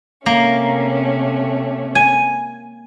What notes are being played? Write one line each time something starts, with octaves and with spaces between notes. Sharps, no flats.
C3 A3 A#3 C#4
G#5